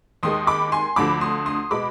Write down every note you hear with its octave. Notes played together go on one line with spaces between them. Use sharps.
D#2 D#3 G#3 C6 D#6
B5 D6
G#5 C6
D2 D3 F3 B5 D6
C6 D#6
C6 D#6
B2 G#3 B5 D6